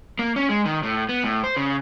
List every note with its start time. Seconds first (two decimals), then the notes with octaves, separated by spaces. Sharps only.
0.19 A#3
0.36 C#4
0.49 G#3
0.65 D#3
0.83 A2
1.09 B3
1.24 A2
1.44 C5
1.56 C#3